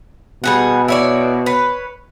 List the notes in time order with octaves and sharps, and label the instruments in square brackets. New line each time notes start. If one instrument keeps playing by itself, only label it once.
[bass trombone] B2 [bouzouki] G3 G#4 F#5
[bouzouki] E4 C#5 D5
B4 C#5